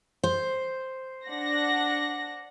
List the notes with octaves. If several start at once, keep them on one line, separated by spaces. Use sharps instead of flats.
C5
D4 F#5 A#6